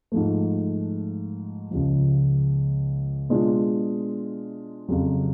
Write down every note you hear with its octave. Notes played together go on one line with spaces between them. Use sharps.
G#2 F3 A3
C#2 C#3 F3
B2 G#3 D4 F4
F2 C#3 F#3